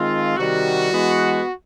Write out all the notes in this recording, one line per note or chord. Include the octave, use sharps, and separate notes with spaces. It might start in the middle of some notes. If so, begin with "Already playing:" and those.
Already playing: D#3 G#3 C4 F4
C3 D#3 G3 F#4
E3 G#3 B3